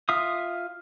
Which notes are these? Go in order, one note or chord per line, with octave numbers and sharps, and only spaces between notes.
F4 E5 F5 D#6